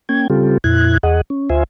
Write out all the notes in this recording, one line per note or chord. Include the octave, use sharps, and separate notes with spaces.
A#3 C#4 G5 G#6
C#3 G3 C4 F4 G4 A4
F2 A#2 E4 F#6 G#6
E2 G#4 D#5 F#5
C#4
D2 F4 C5 E5 G#5